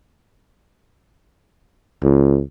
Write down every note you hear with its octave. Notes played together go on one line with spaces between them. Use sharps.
C#2